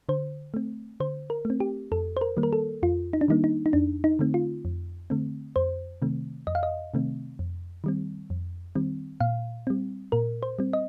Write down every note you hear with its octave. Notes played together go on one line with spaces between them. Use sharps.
D3 C5
A3 C4
D3 C5
A#4
A3
C4
G4
F2 A4
C5
A#4
D#3 G3 A#3
A#4
A4
F2 F4
D#4
D4
D#3 G3 A#3 D#4
D#4
D#4
F2 D4
D#4
D3 A3 C4
F4
F2
D3 A3 C4
F2 C5
C3 D#3 A3 C4
F2 D#5
F5
D#5
C3 D#3 A3 C4
F2
D#3 G3 C4
F2
D#3 G3 C4
A#2 F5
G3 C4
A#2 A#4
C5
G3 C4
D#5